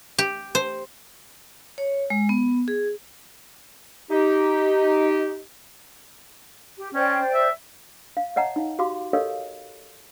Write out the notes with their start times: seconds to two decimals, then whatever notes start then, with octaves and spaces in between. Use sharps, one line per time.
0.18 G4
0.55 C5
1.78 C#5
2.10 G#3
2.29 B3
2.68 G#4
4.11 D#4 G4
6.78 G4
6.94 C#4 C5 D5 G5
7.34 E5
8.17 F5
8.36 C#5 D#5 F#5 A5 A#5
8.56 D#4 F5
8.79 F#4 G4 F5 C6 D6
9.13 G4 A4 A#4 C#5 D#5 F5